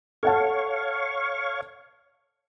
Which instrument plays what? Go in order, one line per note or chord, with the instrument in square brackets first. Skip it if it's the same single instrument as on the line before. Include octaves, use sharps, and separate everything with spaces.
[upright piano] A4 F#5 A5 [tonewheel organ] C#5 F5 C#6